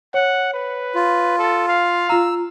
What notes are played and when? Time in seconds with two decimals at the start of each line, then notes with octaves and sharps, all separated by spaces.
0.14 C#5 F#5
0.54 B4
0.95 F4
1.39 A4
1.68 F5
2.09 F4 A#5 E6